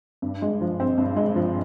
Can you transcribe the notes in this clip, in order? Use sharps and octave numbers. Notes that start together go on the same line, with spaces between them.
G2
G#3
F3
C4
G2
G#3
F3